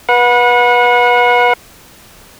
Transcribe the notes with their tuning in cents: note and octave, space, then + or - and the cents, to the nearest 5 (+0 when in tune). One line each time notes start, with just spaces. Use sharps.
B4 -20 F#5 -30